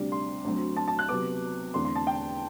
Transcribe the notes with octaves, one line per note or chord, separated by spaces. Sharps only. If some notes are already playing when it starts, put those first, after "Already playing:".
Already playing: D2 C3 G3 D4
C6
D2 D3 F#3 C4
A5
A5
F#6
C3 F#3 B3 D6
E2 D3 A3 C4 C6
C6
A5
G5